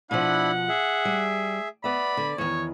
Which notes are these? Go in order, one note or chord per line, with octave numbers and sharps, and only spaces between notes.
B2 F3 D4 E4 F#5 B5
G#4 E5
G3
B3 D5 E5 B5
D3
E2 D#3 C#5